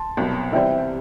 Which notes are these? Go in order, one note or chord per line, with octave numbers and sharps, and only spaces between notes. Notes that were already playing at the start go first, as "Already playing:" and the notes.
Already playing: A5 C6
C2 B2 F#3
C3 E3 G3 C4 E5 G5